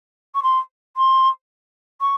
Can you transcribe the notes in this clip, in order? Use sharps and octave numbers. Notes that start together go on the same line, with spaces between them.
C#6
C6
C6
C#6